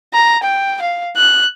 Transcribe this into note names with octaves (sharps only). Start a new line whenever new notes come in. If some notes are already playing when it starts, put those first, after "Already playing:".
A#5
G5
F5
F#6